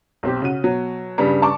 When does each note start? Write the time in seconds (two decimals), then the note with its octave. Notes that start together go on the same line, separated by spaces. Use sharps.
0.23 B1 C4 G4
0.42 C#3 F#4 D#7
0.64 B2 F#3
1.18 G2 C#3 G3
1.42 A5 C#6 D6